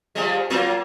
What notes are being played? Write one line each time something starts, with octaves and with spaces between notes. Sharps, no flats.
F3 G3 G#3
F#3 A#3 F4